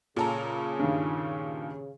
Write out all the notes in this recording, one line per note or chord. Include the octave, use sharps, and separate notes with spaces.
A#2 C#3 A4 A#5
G2 D#3